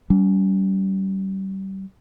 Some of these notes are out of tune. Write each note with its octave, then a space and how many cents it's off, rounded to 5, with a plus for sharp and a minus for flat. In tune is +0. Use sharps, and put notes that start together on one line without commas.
G3 -30 C#4 +35